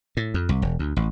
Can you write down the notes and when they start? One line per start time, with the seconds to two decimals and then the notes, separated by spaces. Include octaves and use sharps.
0.17 A2
0.34 F2
0.49 C2
0.62 E1
0.79 D2
0.96 A1